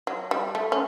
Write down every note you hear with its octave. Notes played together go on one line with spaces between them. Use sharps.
F#3
G3
A3
C#4